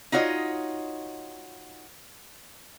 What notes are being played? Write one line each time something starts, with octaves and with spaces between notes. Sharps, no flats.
D#4 F4 F#4 C#5 D#5